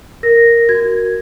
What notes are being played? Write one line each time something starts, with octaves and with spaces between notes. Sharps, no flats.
A#4 A#6
F#4 G#6